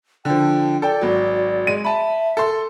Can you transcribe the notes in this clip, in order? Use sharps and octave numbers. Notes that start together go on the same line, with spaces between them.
D3 F3 G5
A4 D5 G5
G#1 F#3
G#3 D#7
E5 A5 B5
A4 C6